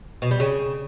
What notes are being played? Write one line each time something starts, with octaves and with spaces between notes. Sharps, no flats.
B2
G3
C#3